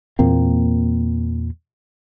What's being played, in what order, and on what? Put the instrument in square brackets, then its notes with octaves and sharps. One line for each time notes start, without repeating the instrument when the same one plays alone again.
[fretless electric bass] E2 A#2 A#3 C4